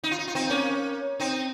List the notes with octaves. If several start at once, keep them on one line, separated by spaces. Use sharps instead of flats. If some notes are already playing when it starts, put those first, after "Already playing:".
D#4
F4
D#4
F4
C4 D#4
A#3 C#4
C4 D#4